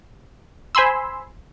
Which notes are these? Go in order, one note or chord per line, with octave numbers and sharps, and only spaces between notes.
C5 G#5 B5 C6 E6